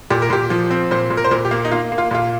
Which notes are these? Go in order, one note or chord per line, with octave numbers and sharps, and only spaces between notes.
A#2 G4
A#4
A#2 G4
F3
C4
A#2 C5
A#2
A#4
C5
A#2 A#4
G4
A#3
D#4
A#3 F4
A#3
F4
A#2 F4